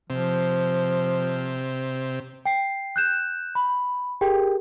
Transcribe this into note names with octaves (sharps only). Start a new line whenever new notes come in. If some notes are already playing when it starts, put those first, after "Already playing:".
C3 F3
G5 C7
F#6 G6 E7
B5
G4 G#4 A#4 G5